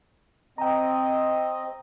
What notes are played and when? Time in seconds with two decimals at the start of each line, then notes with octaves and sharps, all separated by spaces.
0.58 C4 D#5 G5 A#5